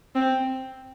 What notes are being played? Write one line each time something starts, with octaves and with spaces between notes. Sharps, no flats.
C4